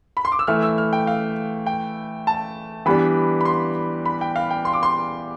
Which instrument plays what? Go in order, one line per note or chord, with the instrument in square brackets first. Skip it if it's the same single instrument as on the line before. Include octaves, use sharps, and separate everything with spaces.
[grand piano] B5
C6
D6
E6
[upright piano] E3 A3 E4 [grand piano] F6
[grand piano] E6
F6
G5
F5
G5
A5
[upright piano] E3 G3 B3 D4 G4 [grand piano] B5
[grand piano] B5
C6
B5
G5
F5
G5
C6
D6
C6